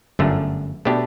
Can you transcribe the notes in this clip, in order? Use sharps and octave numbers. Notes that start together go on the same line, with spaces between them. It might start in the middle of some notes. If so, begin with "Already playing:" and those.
G1 F#2 D3 A3
B2 A3 D4 G4